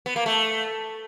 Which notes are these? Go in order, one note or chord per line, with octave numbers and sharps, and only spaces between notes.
B3
A#3
A3